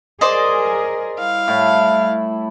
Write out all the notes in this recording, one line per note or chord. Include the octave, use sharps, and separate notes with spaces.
G#4 A#4 C5 D5 D#5
G3 E4 F5
A2